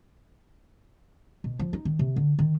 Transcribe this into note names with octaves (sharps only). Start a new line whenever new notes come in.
B2
F3
D#4
D#3
C3
D3
D#3